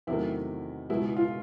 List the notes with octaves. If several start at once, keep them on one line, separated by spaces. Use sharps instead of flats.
E2 C3 D#3 F#3 A3 E4
C#2 B2 G#3 E4
F4